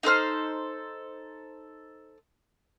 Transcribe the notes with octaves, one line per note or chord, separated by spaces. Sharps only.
D#4 A4 C5 F6